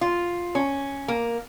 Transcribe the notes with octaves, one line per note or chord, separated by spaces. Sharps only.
F4
C#4
A#3